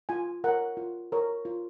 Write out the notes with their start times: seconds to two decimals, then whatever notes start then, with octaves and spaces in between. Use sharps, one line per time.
0.09 F4 G#5
0.44 A#4 C#5 F#5
0.77 F4
1.12 A#4 C#5
1.45 F4